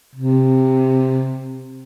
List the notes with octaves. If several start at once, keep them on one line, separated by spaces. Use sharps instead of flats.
C3